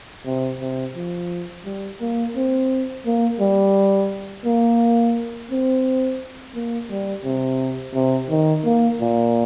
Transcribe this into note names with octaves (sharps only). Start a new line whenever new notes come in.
C3
C3
F3
G3
A#3
C4
A#3
G3
A#3
C4
A#3
G3
C3
C3
D#3
A#3
A#2